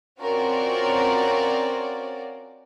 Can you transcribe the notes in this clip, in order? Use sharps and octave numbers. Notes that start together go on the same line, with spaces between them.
C4 C#4 F4 F#4 A#4 D5